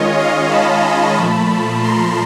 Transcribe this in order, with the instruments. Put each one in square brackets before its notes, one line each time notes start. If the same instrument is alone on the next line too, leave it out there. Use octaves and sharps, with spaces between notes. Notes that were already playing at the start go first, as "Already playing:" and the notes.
Already playing: [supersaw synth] D#3 G#3 C#4 F4 C#5 D#5
D#5 F5
A5 B5
A#2 F3 A3
A#5 C6